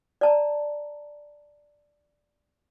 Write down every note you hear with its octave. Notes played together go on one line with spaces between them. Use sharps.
D5 A5 A#5